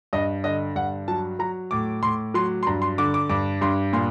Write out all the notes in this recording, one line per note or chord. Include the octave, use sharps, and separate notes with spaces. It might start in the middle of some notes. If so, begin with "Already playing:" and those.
G2 D#5
D3 D#5
G2 F#5
F#3 A5
F#3 A#5
A2 D6
A2 C6
F#3 C6
C6
G2 A#5
C6
D3 D6
D6
G2 D6
G2 C6
A#2 C6